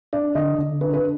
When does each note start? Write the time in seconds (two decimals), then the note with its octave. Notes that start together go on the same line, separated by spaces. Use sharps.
0.13 D4 D5
0.35 D3 D#5
0.59 D3
0.81 D4 B4
0.94 B4